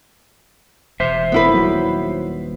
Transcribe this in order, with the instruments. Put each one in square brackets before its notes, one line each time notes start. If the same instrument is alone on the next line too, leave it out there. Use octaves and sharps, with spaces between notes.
[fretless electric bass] E1 [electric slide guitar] C5 E5
[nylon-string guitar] B3 E4 B4
[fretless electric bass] D#1 D#2 F#3